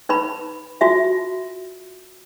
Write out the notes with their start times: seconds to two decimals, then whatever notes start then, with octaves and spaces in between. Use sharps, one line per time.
0.09 D#4 B4 A#5 B5
0.81 F4 F#4 E5